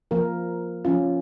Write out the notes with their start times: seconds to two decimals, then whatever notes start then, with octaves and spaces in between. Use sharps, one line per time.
0.11 F3 A#3 F4 A#4
0.85 F3 C#4 F4